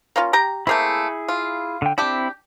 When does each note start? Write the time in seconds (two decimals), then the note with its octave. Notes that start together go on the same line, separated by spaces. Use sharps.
0.16 A#3 C#4 F4
0.33 G4 G5 A#5
0.67 A3 A#3 C4 E4 G#4 G6
1.28 F4
1.82 D3 G5
1.98 C4 D4 E4 G4